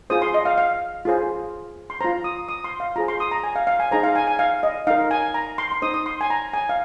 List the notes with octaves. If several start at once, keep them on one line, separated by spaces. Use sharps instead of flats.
F4 G#4 C5 D#6
C6
D#5
F5
F5
F4 G#4 C5
C6
F4 C5 A#5
D#6
D#6
C6
F5
F4 G#4 C5 A#5
C6
D#6
A#5
G#5
F5
F5
G#5
D#4 G#4 C5 A#5
F5
G#5
G#5
F5
D#5
D#4 A#4 F5
G#5
A#5
C6
C6
D#4 C5 D#6
D#6
C6
G#5
A#5
G#5
F5